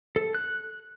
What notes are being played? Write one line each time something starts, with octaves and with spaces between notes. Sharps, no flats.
A4
F#6